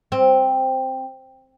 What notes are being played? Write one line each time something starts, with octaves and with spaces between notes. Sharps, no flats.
C4